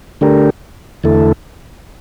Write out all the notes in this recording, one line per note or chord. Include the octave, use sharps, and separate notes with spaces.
D3 A3 D4 G4 A#4
E2 D3 A3 E4 A4